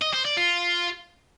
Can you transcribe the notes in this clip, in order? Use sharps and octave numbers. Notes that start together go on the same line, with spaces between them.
D#5
C5
D5
F4